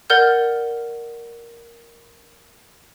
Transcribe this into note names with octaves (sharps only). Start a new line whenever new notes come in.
A#4 D5 F#5 F6 G6